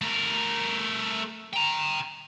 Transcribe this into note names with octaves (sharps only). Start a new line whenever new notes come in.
A3 A#4
G5 A#5